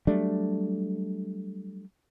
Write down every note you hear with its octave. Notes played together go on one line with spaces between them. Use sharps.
F#3 G3 A3 D4